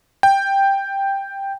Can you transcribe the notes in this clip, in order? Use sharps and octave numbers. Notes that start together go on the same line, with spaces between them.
G5